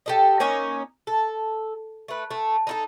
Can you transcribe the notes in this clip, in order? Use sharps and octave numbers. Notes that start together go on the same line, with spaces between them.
G4 A4 D#5
A#3 C#4 D#4 G#5
A4
A3 B4
A3
D#4 E4 A4